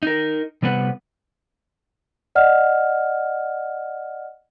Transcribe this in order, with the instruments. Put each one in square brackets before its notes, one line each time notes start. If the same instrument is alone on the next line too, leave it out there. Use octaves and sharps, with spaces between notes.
[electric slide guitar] D#4 A#4
C3 G3 B3 B4 F#5
[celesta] D5 D#5 F#5 F6